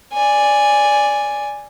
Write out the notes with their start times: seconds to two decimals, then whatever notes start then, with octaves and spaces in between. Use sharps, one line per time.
0.13 D5 G#5